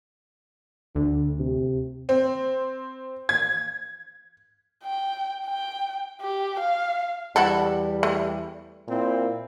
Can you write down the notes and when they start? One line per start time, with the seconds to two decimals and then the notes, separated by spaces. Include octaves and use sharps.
0.95 D2 D3
1.40 C3
2.09 C4
3.29 G#6
4.84 G5
5.46 G5
6.21 G4
6.60 F5
7.36 E2 G3 E4 F#4 A4
8.03 A3
8.88 A#2 C4 E4